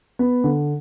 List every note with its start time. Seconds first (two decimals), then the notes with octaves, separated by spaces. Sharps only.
0.19 B3
0.44 D3